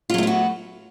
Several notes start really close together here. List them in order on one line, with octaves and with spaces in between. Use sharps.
F4 F#3 A3 B3 F#4